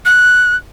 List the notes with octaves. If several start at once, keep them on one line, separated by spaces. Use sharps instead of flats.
F#6